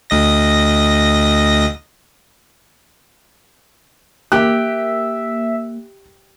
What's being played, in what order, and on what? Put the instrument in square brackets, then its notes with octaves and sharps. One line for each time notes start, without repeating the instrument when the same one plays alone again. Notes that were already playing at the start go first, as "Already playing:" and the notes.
[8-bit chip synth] D2 D#5 A#6
[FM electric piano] A#3 [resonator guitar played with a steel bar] G4 [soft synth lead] E5 [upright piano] F#6